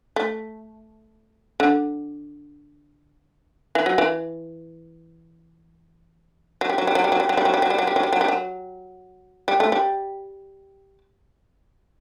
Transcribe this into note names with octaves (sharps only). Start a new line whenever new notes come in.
A3
D3
E3
F#3
E3
F#3
G3
F#3
G3
F#3
G3
F#3
G3
F#3
G3
F#3
G3
F#3
G3
F#3
G3
F#3
G3
F#3
G3
F#3
G3
A3
G3